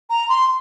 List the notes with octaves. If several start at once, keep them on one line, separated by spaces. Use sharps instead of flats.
A#5
C6